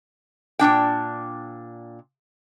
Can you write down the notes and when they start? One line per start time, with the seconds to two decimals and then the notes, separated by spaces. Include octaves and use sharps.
0.59 A#2 C4 D4 G5